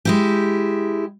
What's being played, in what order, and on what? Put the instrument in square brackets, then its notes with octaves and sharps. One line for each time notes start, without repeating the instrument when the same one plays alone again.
[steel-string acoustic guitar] G#3 E4 G4